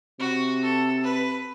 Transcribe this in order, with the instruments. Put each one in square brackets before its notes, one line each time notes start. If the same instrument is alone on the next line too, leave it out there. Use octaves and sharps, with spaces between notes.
[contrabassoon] C3 [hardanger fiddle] F#4
[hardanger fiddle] A4
B4